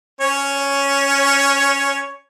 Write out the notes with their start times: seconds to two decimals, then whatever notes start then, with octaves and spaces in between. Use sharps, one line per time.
0.21 C#4 C#5